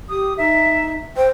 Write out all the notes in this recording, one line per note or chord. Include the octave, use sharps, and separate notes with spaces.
G4 D#6
D#4 E5
C5 G5